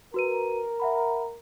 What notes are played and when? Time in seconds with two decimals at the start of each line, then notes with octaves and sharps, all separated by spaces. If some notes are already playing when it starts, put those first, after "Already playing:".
0.14 F#4 A#4 B4 D#7
0.80 E5 F#5 B5